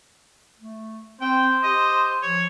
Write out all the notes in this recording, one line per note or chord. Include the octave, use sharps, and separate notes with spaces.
A3
C4 C5 G5
G4 D#5
F3 C#5